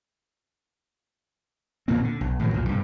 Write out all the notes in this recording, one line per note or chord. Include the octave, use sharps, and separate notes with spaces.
E2 A#2 A#3 C4
D3
B1
A2 D#3 F3 F#3
B1 E2 A#2
G2 C3